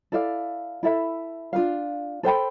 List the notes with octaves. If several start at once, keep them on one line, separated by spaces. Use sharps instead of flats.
E4 A4 D5 F5
E4 A4 E5 B5
D4 F4 C5 F5
A4 C5 G5 B5